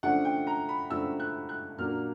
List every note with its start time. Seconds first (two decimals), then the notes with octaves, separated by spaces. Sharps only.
0.03 C#3 F3 A3 D4 F#5
0.25 G5
0.47 A#5
0.69 B5
0.90 C#3 F3 A3 D4 E6
1.20 F#6
1.49 F#6
1.78 A#2 F#3 A#3 D4 F6